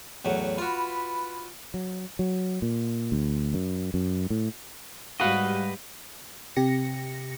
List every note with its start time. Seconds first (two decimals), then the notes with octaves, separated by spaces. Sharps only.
0.25 E2 A2 F#3
0.58 F4 F#4 B4 B5
1.74 F#3
2.19 F#3
2.62 A#2
3.12 D2
3.54 F#2
3.94 F#2
4.30 A2
5.20 G#2 G3 F#4 G4 B4 D#5 F5 F#5
6.56 C3 G4 A#6 C#7